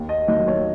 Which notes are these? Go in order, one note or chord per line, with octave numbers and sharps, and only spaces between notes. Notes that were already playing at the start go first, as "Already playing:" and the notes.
Already playing: D#2
D#5
D#3 F#3 A#3 D#5
C#5